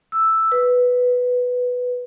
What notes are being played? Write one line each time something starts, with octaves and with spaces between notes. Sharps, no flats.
E6
B4